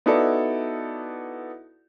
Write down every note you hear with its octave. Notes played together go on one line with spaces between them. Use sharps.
B3 D#4 E4 F#4 A4 D5